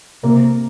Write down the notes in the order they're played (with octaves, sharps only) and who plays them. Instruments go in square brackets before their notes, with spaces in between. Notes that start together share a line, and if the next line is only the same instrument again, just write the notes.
[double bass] C3 [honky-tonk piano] A#3